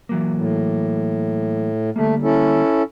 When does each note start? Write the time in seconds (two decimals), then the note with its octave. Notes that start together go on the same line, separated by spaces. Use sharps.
0.09 E3 F#3 A#3
0.36 A2
1.96 D3 G3 A3 A#3
2.23 C#4 E4 A4